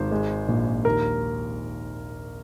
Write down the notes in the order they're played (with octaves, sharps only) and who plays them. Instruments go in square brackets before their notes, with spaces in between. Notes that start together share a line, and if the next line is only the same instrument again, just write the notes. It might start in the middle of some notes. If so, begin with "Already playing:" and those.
Already playing: [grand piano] G#1 C5
G#3
A#1
D#2 A#4